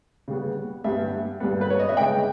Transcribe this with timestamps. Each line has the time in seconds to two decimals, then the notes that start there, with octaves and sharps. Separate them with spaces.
0.28 C#3 G3 B3
0.84 G2 G3 B3 E5
1.40 G2 G3 B3
1.61 B4
1.70 C#5
1.80 D#5
1.89 E5
1.97 C#3 G#3 B3 G5